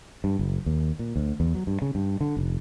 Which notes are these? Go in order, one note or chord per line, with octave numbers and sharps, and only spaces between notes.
G2
F#1
D#2
A#2
D2
E2
F#3
G2
C#3
G2
D3
F1